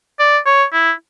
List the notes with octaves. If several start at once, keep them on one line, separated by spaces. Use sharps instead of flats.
D5
C#5
E4